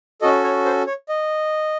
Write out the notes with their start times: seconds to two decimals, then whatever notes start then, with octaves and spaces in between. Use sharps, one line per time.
0.22 C#4 F#4 A4 D#5
0.44 C#5
0.65 C5
0.87 C#5
1.09 D#5